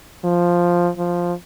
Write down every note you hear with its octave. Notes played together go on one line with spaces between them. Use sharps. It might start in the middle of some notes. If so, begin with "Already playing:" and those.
F3
F3